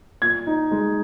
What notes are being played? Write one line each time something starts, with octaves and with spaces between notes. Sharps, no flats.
A#2 G#6
D#4
G#3